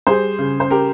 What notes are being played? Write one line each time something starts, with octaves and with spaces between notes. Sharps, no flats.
G3 G#4 C5
C#3
C5
G4 A#4